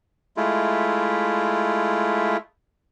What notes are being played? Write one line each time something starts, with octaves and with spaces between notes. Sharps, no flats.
G#3 A3 E4 F4